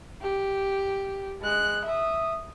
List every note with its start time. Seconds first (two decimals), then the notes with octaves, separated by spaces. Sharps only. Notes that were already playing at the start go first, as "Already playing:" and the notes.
0.22 G4
1.41 G#3 F#6
1.85 E5 D#6